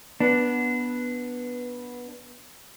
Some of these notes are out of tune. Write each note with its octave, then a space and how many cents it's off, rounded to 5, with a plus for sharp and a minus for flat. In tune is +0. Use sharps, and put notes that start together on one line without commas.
B3 -10 D4 +0